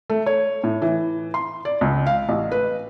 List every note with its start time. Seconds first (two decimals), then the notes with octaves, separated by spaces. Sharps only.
0.10 A3
0.26 C#5
0.64 A2
0.82 E3
1.34 C6
1.65 D5
1.81 C#2
2.07 F5
2.28 A1
2.51 B4